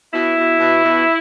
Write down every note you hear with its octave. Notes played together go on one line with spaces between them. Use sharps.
B2 E4
B2
B2
B2